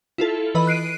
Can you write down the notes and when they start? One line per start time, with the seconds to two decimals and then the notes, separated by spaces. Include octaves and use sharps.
0.18 E4 F4 A4
0.55 E3 B4 D#5 B5
0.67 F#6 C7 D7 D#7